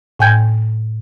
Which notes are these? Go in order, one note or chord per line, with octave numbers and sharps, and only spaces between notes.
A2 G5 G#5 G6 G#6